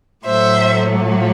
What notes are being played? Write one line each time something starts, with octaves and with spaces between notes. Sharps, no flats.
A2 F#3 A3 C5 E5